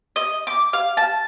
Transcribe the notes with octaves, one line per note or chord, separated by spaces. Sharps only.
D#5
D6
F5
A5